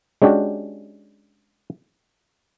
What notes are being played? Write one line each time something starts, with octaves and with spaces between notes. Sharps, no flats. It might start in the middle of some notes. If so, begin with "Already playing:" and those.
G#3 C#4 D4 F#4 G4